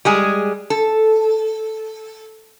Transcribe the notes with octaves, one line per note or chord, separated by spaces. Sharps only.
G3 G#3 G#4
A4